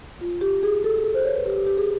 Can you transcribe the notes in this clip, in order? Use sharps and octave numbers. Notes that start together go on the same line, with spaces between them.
F4
G4
G#4
A4
G#4
A4
C5
C#5
B4
G4
G4
G4
G#4